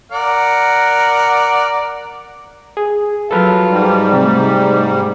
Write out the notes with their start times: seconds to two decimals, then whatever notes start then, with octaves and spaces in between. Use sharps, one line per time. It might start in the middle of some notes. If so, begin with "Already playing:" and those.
0.12 A#4 D5 F#5
2.77 G#4
3.31 F#3 F4 A4 B4 F6
3.69 G#2 G3
4.13 C3 A3